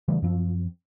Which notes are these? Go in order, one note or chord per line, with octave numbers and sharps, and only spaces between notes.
C#3 E3 G3 A3
F#2 F3 C4